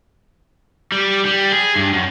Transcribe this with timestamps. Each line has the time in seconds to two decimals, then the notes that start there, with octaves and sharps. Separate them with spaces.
0.92 G3
1.25 G3
1.52 G#4
1.76 G2
1.93 F#2